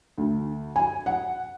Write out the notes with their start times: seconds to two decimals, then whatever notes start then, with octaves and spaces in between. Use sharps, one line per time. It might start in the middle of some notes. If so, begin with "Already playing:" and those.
0.18 D2
0.76 G#5
1.06 F#5